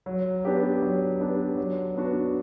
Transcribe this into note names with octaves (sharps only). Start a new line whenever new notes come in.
F#3
B3 D4 G4
F#3
B3 D4 G4
F#3
B3 D4 F#4